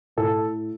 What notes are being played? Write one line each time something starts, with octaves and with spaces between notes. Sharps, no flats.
A2 A4